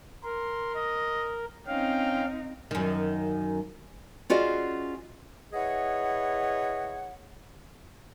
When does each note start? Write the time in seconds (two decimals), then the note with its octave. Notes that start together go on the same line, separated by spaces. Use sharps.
0.24 A#4 C6
0.75 D#5
1.67 C4 C#4 D#4 F5 G5
2.71 F#2 D#3
4.30 C#4 F4 F#4 G#4 D5 D#5
5.53 E4 G#4 B4 C#5 D#5 F#5